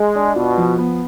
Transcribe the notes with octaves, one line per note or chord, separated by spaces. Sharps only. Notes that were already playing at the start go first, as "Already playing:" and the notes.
Already playing: G#3
D4
B2 F4
F3
B3